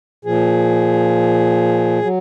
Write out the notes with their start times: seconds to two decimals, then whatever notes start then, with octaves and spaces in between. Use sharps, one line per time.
0.25 A#2 F3 G#4
2.02 F#3